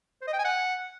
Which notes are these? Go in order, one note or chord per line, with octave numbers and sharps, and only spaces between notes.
C5
D#5
G5
G#5
F#5